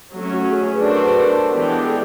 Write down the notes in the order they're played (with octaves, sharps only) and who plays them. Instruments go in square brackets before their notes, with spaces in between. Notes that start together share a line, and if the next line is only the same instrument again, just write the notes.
[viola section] F#3 A3 C#4
[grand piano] F#4
G#4
G#4
B4
[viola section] D4 F#4 A4 C5 [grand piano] A#4
[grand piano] B4
B4
A#4
[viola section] E3 G#3 B3 D4 G4
[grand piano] A4